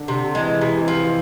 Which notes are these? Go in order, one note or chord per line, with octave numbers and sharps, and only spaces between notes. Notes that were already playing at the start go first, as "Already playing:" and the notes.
Already playing: D3
C3
E3 G#3
C3
F3